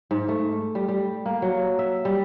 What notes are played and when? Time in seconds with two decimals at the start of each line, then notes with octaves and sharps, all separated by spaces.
0.11 G#2
0.28 A3
0.75 G3
0.88 G3
1.26 A#3
1.42 F#3
1.79 E5
2.05 G3